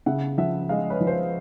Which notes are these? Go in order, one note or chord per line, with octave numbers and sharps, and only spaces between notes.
C#3 E5 F#5
F3 E5 F#5
G#3 D#5 F5
B4 C#5
F3
C5
B4